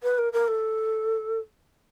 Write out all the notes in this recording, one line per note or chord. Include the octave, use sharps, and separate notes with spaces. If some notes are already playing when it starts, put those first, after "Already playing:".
B4
A#4
A#4
A4